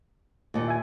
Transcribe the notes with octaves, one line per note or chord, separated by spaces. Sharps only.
D#2 A#2
E5 G#5